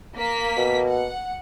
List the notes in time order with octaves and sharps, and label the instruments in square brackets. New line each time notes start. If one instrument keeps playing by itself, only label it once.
[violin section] A#3 B6
[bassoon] B2
[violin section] F#5